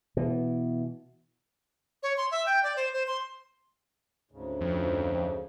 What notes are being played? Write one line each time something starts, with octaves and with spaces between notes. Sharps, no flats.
B2 E3
C#5
C6
E5
G5
D5
C5
C5
C6
D2 G#2 C#3
F2